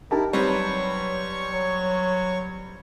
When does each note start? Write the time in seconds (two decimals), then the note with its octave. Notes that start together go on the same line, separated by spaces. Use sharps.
0.11 D#4 E4 G4 A#4 A5
0.33 F#3 G3 C4 B4 C#5 C#6
1.51 F#3